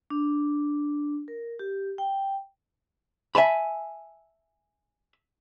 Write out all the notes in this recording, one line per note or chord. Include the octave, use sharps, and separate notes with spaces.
D4
A#4
G4
G5
E5 G#5 A5 B5